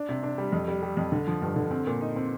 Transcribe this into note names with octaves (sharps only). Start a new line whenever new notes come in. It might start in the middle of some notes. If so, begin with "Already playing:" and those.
Already playing: D4
C3
D4
G3
F2
G3
G3
F2
D3
F3
G2
D3
C4
A#2
D#4
C4